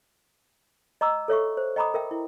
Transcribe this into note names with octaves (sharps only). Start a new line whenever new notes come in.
D#5 A#5 D6 E6
A4 C#5 E5 C#6
C5
D#5 G5 A#5 B5 D6 D#6
A#4 E5 G5
E4